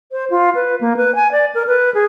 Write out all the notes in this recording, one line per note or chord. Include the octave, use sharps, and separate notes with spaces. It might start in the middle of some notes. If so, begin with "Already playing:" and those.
C5
F4
B4
A#3
B4
G#5
D5
A#4
B4
G#4